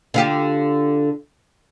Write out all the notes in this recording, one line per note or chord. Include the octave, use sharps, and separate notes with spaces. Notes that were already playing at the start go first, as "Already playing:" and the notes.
D3 F4 G4